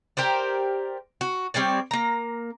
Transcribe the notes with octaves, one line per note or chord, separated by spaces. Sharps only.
G4 A#4 C5 D5
F#4
G3 C4 C#5 D5
A#3 A#5